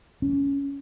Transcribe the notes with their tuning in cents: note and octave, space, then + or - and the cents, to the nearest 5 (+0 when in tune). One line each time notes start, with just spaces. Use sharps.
C#4 +10